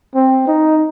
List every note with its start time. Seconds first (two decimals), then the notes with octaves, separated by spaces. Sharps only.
0.15 C4
0.48 D#4